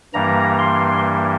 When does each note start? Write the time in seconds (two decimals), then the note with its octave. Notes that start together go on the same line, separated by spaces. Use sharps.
0.14 G2 E3 G3 A#3 A#5
0.59 C6